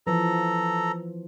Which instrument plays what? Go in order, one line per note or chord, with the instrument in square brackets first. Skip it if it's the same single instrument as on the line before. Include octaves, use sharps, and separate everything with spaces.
[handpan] E3 F3 [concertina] A4 A#5